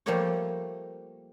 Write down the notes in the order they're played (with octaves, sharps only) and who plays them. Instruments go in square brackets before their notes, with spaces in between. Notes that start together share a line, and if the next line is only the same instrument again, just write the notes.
[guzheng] F3 G3 A3 A#3 A#4 C#5